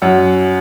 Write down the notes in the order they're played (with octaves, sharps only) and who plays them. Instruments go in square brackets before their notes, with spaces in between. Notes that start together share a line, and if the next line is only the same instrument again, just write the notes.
[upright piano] F#2 F#5